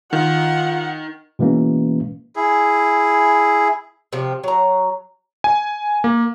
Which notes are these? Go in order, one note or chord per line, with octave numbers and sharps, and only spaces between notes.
D#3 F4 F#5
B2 E3 G#3 A#3 C#4
E4 G#4
C3 F3 G4
F#3 A#5
G#5
A#3